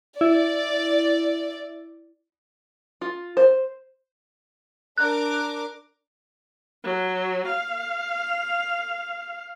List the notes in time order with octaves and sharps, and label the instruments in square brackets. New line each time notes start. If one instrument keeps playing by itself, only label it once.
[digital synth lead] E4 [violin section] D5
[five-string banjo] F4
C5
[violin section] D4 A#4 D6 [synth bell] F#6
[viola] F#3
F5